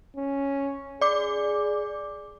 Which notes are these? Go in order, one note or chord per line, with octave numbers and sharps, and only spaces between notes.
C#4
G#4 D5 D6